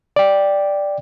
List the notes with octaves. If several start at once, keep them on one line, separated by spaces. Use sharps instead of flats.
D5 G5